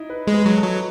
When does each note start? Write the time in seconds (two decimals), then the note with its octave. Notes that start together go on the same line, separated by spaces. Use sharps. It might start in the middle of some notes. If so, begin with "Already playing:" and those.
Already playing: D#4 E4
0.10 B4
0.27 G#3
0.34 B4
0.46 F#3
0.57 A4
0.63 F#3